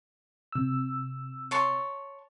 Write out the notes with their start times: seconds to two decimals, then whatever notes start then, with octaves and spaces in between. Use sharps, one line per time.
0.52 C3 E6
1.51 C#5 A5 C6